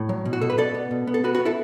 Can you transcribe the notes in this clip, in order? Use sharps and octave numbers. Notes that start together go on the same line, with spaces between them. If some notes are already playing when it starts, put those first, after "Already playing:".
Already playing: A2
F#3
B2
F#4
B2 A4
B4
B2 A4 D5
B3
B2
B3
A4
B3 F#4 B4
F#4 B4
B3
E4 A4